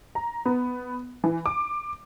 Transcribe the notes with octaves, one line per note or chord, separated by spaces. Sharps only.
A#5
B3
E3
D6